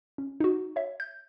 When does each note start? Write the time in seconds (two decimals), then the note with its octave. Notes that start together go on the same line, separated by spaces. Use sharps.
0.18 C#4
0.40 D#4 F#4
0.76 C#5 E5
1.00 G6